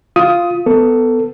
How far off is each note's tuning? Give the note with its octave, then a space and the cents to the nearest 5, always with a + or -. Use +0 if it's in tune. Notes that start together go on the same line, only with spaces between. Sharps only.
F4 +0 D#6 +15
B3 +15 A4 +15